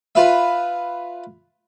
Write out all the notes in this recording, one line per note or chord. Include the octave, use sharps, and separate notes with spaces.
F4 B4 E5